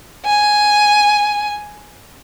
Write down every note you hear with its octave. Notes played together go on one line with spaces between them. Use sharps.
G#5